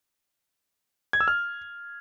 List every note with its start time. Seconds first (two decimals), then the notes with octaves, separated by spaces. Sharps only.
1.13 G#6
1.20 E6
1.28 F6